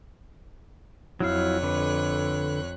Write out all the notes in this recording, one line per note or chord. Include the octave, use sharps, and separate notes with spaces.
F2 F#3 E4 C#5 F5 F#6
D3 B4